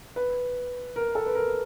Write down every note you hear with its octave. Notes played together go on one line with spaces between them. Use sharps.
B4
A#4
A4
B4
A#4